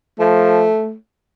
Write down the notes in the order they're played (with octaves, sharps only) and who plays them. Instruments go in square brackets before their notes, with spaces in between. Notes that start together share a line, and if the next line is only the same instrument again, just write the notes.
[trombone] F3 [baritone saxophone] A3